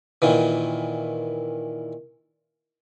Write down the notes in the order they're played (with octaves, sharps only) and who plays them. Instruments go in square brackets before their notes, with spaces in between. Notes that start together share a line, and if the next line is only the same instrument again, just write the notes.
[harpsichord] A#2 D#3 E3